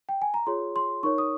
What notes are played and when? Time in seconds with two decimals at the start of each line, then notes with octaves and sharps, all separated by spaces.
0.09 G5
0.22 G#5
0.34 A#5
0.47 F4 G#4 C#5 C6
0.76 C6
1.03 D#4 A#4 C#5 C#6
1.18 D#6